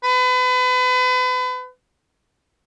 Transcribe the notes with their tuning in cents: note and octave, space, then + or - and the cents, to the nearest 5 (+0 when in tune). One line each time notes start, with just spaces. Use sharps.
B4 +35